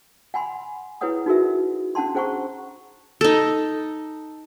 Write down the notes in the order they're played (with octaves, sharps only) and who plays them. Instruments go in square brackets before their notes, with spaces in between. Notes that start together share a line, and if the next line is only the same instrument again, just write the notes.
[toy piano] F#5 G#5 B5 C6
E4 G#4 B4 C#5 F#5 D#6
D#4 F#4 G#4 A#4 E5
C#4 D4 F#5 A5 C6
C#4 G#4 C5 F#5 A#5 C#6
[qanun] D#4 A4